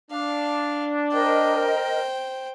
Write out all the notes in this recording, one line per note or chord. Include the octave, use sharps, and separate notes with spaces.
D4 F5
A#4 C5 D#5 G5